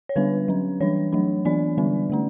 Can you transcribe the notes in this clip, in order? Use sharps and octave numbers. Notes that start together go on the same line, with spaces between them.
C#5
D3 G3 B3 D4 B4
F#3 C#4
E3 G3 D4 C#5
F#3 A3 D4
E3 B3 D4 D5
D3 G3 B3 D4
D3 A3 C#4